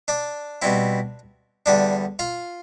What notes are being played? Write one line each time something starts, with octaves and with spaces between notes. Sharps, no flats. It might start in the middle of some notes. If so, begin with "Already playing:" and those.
D4 D5
B2 G3 C4 E4
E2 D3 G3 D4 D5
F4 F5